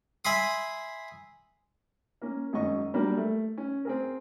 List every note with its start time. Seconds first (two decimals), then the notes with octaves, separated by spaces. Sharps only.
0.25 E5 G#5 B5 C6 D#6
2.22 A#3 C#4
2.53 G#1 F#2 D#5 C#6
2.94 F#3 G3 A#3 D4 G4
3.17 A3
3.58 C#4
3.85 C4 G#4 A#4